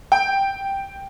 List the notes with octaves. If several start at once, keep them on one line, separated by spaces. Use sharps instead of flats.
G5